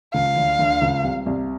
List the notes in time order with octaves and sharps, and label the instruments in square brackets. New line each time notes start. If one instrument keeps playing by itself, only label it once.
[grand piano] C#2 C#3 [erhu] F5
[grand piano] D2 D3
D2 D3
C#2 C#3
C2 C3
C2 C3